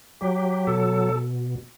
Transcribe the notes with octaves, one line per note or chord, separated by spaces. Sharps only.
F#3 G4
B2 A4